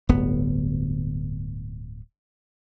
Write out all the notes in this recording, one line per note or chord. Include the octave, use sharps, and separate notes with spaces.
D1 G1 B3